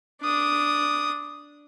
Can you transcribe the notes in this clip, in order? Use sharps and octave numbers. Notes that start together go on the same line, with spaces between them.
D4 D#6